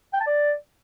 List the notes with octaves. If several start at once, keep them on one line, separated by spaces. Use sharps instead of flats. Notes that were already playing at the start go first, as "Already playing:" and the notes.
G5
A5
D5